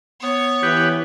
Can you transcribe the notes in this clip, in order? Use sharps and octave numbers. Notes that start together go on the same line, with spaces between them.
B3 C#5
E3 G4 B4